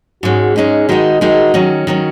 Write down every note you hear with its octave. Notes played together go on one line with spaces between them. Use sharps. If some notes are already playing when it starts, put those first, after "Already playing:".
G#2 G#3 C#4 F#4
G#2 G#3 C#4 D#4
D#3 G#3 D#4 F#4
D#3 G#3 D#4 F#4
D#3 F#3 C#4
D#3 F#3 C#4